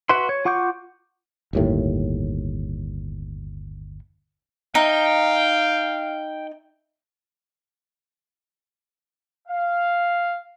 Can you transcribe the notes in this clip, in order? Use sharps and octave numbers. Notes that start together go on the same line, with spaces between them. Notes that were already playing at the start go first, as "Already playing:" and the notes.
F#4 B4 E5 C6
C#5
F4 F#5 C#6 D6 G6
G1 D#2 A2
D#4 F5 G5
F5